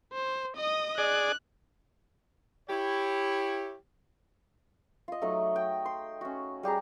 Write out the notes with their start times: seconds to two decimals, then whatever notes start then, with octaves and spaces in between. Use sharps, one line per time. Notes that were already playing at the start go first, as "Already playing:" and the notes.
0.13 C5
0.57 D#5 D#6
0.98 G#4 D5 F#6
2.69 E4 G4 C#5
5.08 F4 D#5
5.22 F#3 A3 D#4 F#5
5.56 G5
5.85 C6
6.21 C#4 F#4
6.63 G3 G4 G#4 A#5